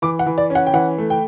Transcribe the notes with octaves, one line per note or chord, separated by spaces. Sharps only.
E3 D6
F#5
E3
D5
C#4
F#5
G5
E3 F#5
A3
G5